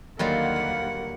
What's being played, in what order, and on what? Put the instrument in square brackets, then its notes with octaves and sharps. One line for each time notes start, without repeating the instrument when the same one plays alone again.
[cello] D#2 F#5 [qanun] D3 D#3 [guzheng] F#3 G3 F4 [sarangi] A#3
[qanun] B4 D5